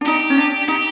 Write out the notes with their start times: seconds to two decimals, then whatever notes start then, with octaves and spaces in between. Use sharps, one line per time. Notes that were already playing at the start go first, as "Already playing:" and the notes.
0.01 D4
0.06 D#4 G4
0.30 C#4
0.38 D4
0.68 D#4 G4